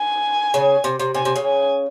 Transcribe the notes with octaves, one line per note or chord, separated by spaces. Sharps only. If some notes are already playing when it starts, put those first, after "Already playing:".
Already playing: G#5
C#3
C3
C3
C3 G#5
C3
C#3
G#5